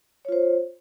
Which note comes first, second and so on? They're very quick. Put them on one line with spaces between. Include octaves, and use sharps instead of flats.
C#5 F4 C5